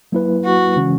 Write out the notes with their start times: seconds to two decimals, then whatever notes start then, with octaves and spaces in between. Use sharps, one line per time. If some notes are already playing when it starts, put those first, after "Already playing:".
0.12 F#3 A#3 E4 B4
0.44 F#4
0.76 C#3 E3 G#3 C#4